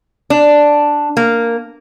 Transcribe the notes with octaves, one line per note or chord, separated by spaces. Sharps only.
D4
A#3